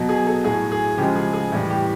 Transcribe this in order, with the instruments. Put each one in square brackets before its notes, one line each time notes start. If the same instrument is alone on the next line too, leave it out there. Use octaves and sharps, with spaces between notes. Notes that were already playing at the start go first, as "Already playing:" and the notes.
Already playing: [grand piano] B2 F#3
G#4
A4
A2 F#3 G#4
G#4
C#3 F3 G#3 G4
G#4
G#4
A2 E3 G3
G4